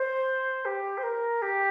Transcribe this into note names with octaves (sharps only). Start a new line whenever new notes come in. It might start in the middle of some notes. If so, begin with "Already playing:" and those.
Already playing: C5
G4
C5
A#4
G4